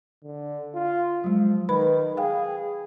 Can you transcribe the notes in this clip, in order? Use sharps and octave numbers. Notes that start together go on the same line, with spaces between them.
D3
F4
F3 F#3 G#3
D#3 B4 B5
G#4 F5 G5